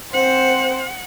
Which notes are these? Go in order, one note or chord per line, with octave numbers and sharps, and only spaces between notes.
C4 C5 F#5